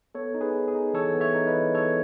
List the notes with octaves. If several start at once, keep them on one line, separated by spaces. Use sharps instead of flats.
B3 A4 C#5
D#4
G#4 B4
B3
G#4
D#4
E3 A4 C#5
B3
C#5 E5
D#4
B4 D#5
E3
B3 A4 C#5